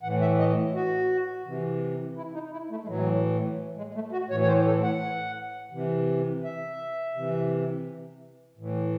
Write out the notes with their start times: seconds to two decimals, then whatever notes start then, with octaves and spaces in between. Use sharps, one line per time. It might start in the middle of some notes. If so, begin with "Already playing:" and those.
0.03 A2 E3 F#5
0.21 E5
0.39 D#5
0.74 F#4
1.46 C3 E3
2.17 E4
2.34 D#4
2.52 E4
2.70 A3
2.83 G#3
2.87 A2 E3 F#3
3.77 G#3
3.94 A3
4.12 F#4
4.30 A2 E3 C#5
4.42 C#5
4.47 C5
4.66 A4
4.83 F#5
5.72 C3 E3
6.44 E5
7.14 C3 E3
8.57 A2 E3